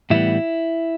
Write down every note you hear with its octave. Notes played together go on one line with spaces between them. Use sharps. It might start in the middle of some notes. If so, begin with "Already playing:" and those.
A2 E3 G3 B3 E4